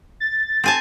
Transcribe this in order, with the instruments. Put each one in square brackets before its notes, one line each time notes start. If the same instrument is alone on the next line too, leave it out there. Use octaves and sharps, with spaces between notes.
[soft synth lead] A6
[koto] C4 G#5 A5